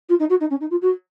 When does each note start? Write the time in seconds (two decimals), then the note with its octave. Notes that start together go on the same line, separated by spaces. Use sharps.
0.09 F4
0.19 D#4
0.29 F#4
0.40 D#4
0.50 C#4
0.60 D#4
0.70 F4
0.81 F#4